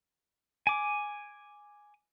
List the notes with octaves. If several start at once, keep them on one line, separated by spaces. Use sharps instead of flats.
G#5 D6